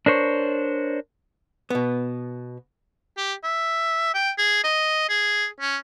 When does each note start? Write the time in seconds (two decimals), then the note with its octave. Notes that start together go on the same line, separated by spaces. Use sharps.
0.06 D4 A#4 C5 C#5
1.70 B2 B3
3.17 G4
3.44 E5
4.15 G5
4.38 G#4
4.64 D#5
5.09 G#4
5.60 C#4